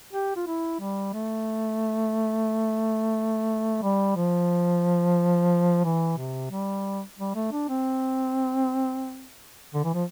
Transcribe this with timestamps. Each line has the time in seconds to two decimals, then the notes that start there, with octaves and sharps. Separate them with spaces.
0.13 G4
0.36 F4
0.47 E4
0.80 G3
1.13 A3
3.82 G3
4.16 F3
5.85 E3
6.18 C3
6.51 G3
7.19 G3
7.35 A3
7.52 D4
7.69 C4
9.74 D3
9.84 E3
9.94 F3